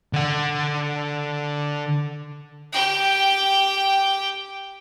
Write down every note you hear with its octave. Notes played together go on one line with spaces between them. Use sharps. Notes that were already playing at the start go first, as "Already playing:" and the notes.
D3 F#5
G4 G5